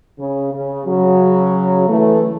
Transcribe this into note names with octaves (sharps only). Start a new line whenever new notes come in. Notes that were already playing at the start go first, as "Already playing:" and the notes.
C#3
C#3
C#3 F#3
E3 A3